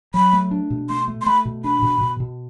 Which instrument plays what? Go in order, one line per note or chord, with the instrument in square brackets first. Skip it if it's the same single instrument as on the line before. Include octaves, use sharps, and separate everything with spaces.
[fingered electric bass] F#3 [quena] B5
[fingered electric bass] A3
D4
B2
[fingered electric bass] A3 [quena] C6
[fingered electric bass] A3
[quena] C6
[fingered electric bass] A3 [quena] B5
[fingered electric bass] B2
[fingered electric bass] D4 [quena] B5
[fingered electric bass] B2
B2
B2